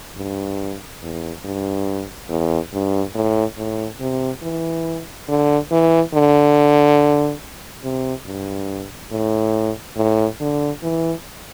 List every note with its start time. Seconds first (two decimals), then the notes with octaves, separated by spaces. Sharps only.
0.17 G2
1.02 E2
1.45 G2
2.29 E2
2.73 G2
3.15 A2
3.57 A2
4.01 C3
4.42 E3
5.28 D3
5.72 E3
6.14 D3
7.84 C3
8.26 G2
9.11 A2
9.97 A2
10.40 D3
10.83 E3